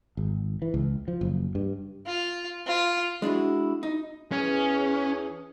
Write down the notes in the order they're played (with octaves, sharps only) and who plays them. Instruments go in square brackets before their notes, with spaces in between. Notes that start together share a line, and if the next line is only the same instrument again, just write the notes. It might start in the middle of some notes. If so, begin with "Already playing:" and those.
[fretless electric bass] G#1
E3
C#2
F3
F#1
G2
[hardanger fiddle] F4
F4
[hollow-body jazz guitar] G#3 D4 E4 F#4
D#4
[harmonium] E2 E3 G#4 [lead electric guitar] C#4